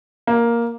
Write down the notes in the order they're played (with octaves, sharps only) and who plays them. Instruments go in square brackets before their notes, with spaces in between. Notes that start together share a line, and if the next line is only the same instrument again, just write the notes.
[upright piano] A#3